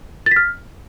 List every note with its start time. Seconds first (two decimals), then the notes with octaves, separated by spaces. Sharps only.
0.26 A6
0.31 B6
0.36 F6